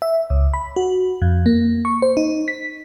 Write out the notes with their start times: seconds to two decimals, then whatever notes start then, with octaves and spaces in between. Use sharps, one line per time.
0.02 E5
0.30 C#2
0.54 B5
0.76 F#4
1.22 F2
1.46 A#3
1.85 C#6
2.02 C5
2.17 D#4
2.48 B6